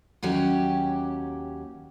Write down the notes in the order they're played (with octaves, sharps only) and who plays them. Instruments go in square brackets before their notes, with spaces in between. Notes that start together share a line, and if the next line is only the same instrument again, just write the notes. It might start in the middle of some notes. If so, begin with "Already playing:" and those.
[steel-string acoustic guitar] D#2 F#3 C#4 G4